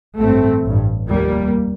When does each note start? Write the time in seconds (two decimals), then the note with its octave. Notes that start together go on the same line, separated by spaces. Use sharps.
0.20 A1 G2 A3 C4
0.64 A1 G2
1.08 F1 D#2 G3 A#3